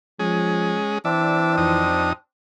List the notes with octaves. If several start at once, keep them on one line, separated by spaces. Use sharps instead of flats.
F3 G#3 C#4 G#4
E3 C4 D4 D5 E5
F2 D#4 D#6